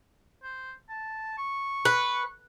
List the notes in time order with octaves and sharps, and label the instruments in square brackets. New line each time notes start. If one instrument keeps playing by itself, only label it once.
[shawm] C5
A5
C#6
[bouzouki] B4